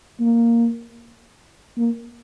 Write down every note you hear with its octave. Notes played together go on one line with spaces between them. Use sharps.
A#3
A#3